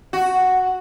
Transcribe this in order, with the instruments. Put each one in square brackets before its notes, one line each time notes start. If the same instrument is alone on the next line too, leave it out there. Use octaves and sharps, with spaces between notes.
[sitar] F#4